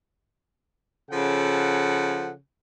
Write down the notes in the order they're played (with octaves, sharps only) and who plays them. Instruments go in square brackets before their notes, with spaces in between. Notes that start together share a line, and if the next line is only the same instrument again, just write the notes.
[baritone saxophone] C#3 [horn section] F3 A4 F#5